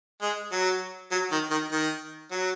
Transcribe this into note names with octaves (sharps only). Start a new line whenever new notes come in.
G#3
F#3
F#3
D#3
D#3
D#3
F#3